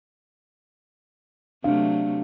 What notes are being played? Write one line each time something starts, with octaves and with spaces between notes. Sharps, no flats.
C3 F#3 A3 D4 F5